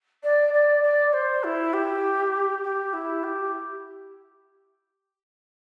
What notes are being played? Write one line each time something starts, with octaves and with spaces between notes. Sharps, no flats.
D5
D5
D5
C5
E4
G4
G4
E4
G4